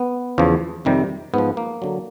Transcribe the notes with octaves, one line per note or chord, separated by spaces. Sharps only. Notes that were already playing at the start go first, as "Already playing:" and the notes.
Already playing: B3
E2 C#3 F3
F2 C3 D#3 G3
G#2 F3 B3
A#3
D3 F#3